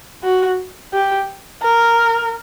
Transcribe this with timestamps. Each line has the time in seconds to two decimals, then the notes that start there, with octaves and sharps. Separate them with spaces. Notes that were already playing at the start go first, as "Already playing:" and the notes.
0.24 F#4
0.94 G4
1.63 A#4